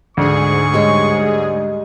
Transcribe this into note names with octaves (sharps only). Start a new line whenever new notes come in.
D2 G#2 G#4 C#6
G3 G#3 C#5